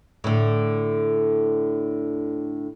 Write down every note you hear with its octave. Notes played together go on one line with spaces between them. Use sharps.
A2 D3